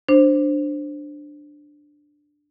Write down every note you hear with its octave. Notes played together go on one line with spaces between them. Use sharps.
D4 C5